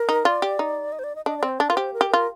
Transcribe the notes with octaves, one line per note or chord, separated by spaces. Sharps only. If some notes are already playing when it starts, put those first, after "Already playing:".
Already playing: A#4
D#4
F4 D5
G4
D#4
D#5
C5
D5
D#5
D4 D#5
C4 D5
C5
D4 D5
F4 A#4
G4 C5
A#4
G4
F4 A#4